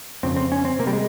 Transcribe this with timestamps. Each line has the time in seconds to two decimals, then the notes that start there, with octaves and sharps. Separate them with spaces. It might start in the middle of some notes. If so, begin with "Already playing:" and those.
0.23 F2 C#3 C4
0.36 C4
0.52 C#4
0.65 C4
0.79 C3 A#3
0.87 G3
0.93 G#3